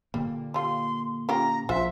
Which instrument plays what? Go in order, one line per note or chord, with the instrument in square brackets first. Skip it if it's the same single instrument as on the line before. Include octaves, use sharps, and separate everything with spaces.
[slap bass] A#2 D3 A#3 [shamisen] G3
[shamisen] G3 F4 [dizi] C6
[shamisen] C#4 F4 G4 [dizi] A#5
[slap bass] A#1 [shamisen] F4 F#4 C5 [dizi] E5